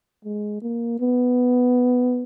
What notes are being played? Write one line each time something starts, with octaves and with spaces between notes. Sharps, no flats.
G#3
A#3
B3